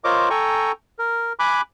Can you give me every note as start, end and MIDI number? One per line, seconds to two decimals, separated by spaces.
0.04 0.29 65
0.04 0.29 70
0.04 0.29 72
0.04 0.29 73
0.04 0.29 75
0.04 0.29 86
0.30 0.72 69
0.30 0.72 79
0.30 0.72 80
0.30 0.72 82
0.30 0.72 85
0.99 1.33 70
1.39 1.61 80
1.39 1.61 83
1.39 1.61 86
1.39 1.61 90